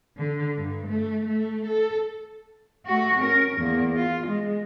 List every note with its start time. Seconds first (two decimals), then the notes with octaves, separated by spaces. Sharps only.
0.17 D3
0.57 G2
0.88 A3
1.26 A3
1.67 A4
2.86 A3 F#4
3.19 C#4 A#4
3.56 E2 A#3
3.96 F4
4.27 G#3